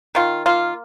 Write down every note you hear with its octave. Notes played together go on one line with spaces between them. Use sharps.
D#3 F4
A#3 F4